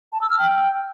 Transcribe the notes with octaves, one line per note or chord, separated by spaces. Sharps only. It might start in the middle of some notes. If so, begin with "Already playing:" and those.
A5
E6
F6
G5